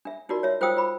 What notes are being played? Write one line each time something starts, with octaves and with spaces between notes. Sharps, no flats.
D4 E5
D4 D#4 F4 F#4 A#4 D5
C#5 E5
F4 C5 F5 G5 D#6 E6
F4 C5 B5 D6